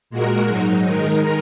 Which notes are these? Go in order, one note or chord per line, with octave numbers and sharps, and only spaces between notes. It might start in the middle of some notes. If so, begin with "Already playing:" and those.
A#2 G#3 F#4 A#4
G#2 F#3 D#4
D#3 G#3 D#4 A#4